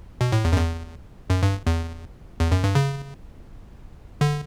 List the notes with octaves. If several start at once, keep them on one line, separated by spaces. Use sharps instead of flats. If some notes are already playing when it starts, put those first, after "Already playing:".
B2
A2
E2
F#2
E2
F#2
G2
E2
E2
F#2
G2
C#3
D3